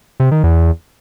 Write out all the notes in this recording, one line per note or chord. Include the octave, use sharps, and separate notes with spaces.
C3
D#3
E2